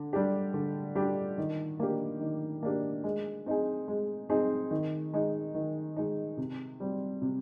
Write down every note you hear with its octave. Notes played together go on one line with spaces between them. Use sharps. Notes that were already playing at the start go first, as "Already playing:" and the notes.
Already playing: D3
G3 D4 G4
D3
G3 D4 G4
D#3
A#3 D4 G4
D#3
A#3 D4 G4
G#3
C4 D#4 G#4
G#3
C4 D#4 G#4
D#3
G#3 D#4
D#3
G#3 D#4
C3
G3 C4
C3